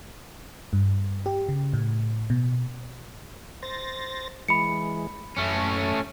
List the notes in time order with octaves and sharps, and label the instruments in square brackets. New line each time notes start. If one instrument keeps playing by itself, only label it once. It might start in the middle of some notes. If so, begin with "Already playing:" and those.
[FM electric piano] G2
G4
C#3
A2
B2
[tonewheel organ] C5 A6 A#6
[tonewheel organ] E3 G#3 [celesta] B5 C#7
[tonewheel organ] F#2 [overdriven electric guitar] A3 C#4